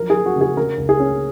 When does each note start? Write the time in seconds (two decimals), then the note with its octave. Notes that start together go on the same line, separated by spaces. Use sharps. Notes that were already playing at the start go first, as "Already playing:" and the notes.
Already playing: F3 F#3 A#4
0.10 G#4
0.15 F3
0.26 F#4
0.36 C#3
0.41 G#4
0.57 C#3 A#4
0.78 C#2
0.89 G#4
1.00 C#4